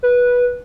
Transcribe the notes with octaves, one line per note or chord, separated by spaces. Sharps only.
B4